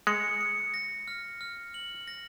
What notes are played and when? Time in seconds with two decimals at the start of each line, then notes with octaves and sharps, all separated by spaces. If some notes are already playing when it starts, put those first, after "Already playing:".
0.07 G#3 C#7
0.41 C#7
0.74 A#6
1.08 F6
1.41 F6
1.74 F#7
2.08 A#6